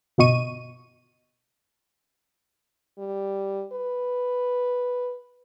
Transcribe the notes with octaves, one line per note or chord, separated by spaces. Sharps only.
G1 B2 B3 D#5 C#6 D#7
G3
B4